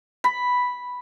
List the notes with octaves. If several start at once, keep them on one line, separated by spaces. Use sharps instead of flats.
B5